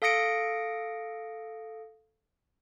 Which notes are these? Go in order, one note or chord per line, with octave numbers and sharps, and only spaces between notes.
A4 F5 D#6 A#6 C#7 D7